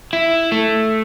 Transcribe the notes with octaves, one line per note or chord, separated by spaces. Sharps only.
E4
A3